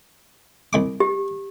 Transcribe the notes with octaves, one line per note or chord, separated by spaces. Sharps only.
C2 G#3 D6
G4